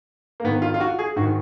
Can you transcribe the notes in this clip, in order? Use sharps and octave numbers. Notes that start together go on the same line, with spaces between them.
A#3
G#2 D#3 B3
F4
F4
F#4
G#4
G#2 D#3 F#4